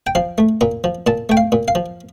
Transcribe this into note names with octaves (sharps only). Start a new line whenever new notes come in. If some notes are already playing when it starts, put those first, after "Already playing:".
G5
F3 F5
A3
A#2 A#5
F3
A#2 A5
A3 G5
F5
A#2
F5
F3